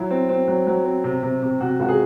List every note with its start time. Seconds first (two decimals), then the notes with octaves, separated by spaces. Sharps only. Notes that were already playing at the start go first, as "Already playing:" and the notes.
Already playing: F#3 E4
0.10 C4
0.29 C4
0.48 F#3
0.67 F#3
0.85 C4
1.04 C3
1.23 C3
1.42 C3
1.61 C3 F#4
1.79 C#2 F#4
1.89 G#4